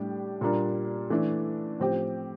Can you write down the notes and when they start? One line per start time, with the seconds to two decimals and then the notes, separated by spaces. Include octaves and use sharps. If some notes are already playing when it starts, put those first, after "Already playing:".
Already playing: A2 G3 D4 G4
0.41 A#2 G3 A#3 D4
1.10 E3 A3 D4
1.80 A2 F3 C4 G4